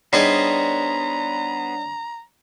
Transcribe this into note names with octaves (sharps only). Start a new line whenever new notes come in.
G3 B3 D4 D#4 G#4 C5 C#5 A#5